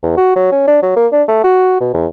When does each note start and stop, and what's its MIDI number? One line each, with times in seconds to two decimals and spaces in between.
0.03 0.13 40
0.18 0.35 66
0.36 0.52 54
0.52 0.66 61
0.68 0.78 62
0.83 0.92 54
0.96 1.07 58
1.12 1.23 62
1.28 1.43 57
1.44 1.77 66
1.80 1.89 47
1.94 2.07 40